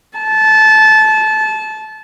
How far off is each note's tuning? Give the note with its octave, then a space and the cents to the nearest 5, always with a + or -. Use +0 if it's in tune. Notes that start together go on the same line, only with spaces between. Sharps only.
A5 -20